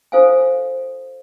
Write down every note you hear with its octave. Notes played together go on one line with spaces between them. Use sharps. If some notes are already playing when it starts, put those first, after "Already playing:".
E4 A4 C5 F5 G#5